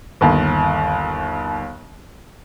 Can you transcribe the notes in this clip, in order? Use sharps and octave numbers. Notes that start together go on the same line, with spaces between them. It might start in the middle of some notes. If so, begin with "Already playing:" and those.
G1 D#2